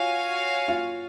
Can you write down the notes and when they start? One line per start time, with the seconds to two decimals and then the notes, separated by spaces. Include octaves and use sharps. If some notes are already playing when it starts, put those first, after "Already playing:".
Already playing: F4 F#4 C#5 F5 G#5
0.68 F4